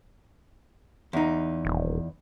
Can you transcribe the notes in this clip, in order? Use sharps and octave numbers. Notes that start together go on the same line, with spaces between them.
E2 D#4
D#1